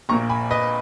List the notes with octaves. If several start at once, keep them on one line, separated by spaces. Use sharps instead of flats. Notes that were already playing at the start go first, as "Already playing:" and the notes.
A#1 A#2 A#3 A#5 C#6
G#5 B5
B4 D#5